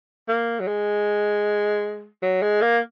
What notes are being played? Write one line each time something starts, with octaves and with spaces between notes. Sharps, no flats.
A#3
F#3
G#3
F#3
G#3
A#3